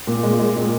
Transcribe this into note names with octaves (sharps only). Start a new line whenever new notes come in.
A#2
G#3
G#3
A#2